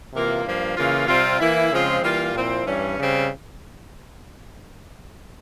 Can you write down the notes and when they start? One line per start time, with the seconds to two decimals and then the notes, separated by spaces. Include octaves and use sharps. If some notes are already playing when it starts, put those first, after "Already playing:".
0.13 C3 E3 A#3 F4
0.45 G2 F3 A#3
0.77 C#3 E3 A#3 F4
1.08 C3 G3 C4 F4
1.40 E3 A#3 E4
1.72 C#3 F3 G#3 C4 F4
2.03 E3 G3 A#3 F4
2.35 A#2 F3 C4 E4
2.66 G2 E3 G3 C#4
2.98 C#3 G3 C4